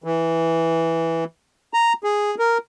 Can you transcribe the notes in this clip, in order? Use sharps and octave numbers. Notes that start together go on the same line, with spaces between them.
E3
A#5
G#4
A#4